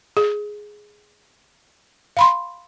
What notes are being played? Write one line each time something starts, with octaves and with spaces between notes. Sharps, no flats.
G#4
F5 B5 C6